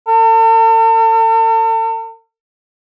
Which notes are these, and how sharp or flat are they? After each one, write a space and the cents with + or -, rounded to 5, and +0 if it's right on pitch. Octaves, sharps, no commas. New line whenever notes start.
A4 +45